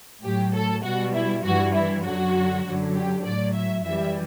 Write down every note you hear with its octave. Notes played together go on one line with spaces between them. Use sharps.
A2 F#3 G4
A4
B2 G3 F#4
E4
G2 E3 G3 F#4
E4
F#2 D3 F#3 F#4
F#2 D3 F#3
G4
A2 F#3 D5
E5
F#2 E3 G3 E5